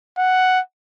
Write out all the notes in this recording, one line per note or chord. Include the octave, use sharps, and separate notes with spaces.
F#5